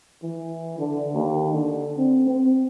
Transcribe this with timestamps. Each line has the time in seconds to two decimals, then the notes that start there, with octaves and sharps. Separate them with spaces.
0.23 E3
0.79 D3
1.14 D#2
1.54 D3
1.98 C4
2.27 C4